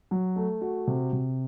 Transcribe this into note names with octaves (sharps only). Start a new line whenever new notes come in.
F#3
A3
F#4
C3
C3